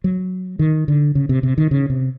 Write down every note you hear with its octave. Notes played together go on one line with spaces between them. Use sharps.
F#3
D#3
D3
C#3
C3
C3
D#3
C#3
C3